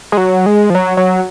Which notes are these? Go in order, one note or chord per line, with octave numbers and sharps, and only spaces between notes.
G#3
F#3
G#3
F3
F#3
F#3